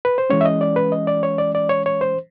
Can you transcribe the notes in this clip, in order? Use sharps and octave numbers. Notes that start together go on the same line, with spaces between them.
B4
C5
E3 G#3 C#4 C#5
E5
D#5
D5
B4
D#5
D5
C#5
D5
D5
C#5
C#5
C5